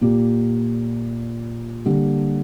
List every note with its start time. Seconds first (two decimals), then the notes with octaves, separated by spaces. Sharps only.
0.01 A#2 A#3 G4
1.85 D3 G3 A#3 G4